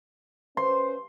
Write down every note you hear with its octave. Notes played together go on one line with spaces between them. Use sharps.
C#4 B4 C5 C6